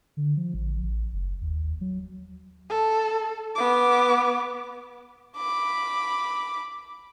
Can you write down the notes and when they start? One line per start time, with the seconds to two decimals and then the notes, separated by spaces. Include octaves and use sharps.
0.17 D3
0.37 F3
0.54 A1
0.83 A1
1.13 F#1
1.41 D#2
1.81 F#3
2.70 A4
3.55 B3 D6
5.36 B5 D6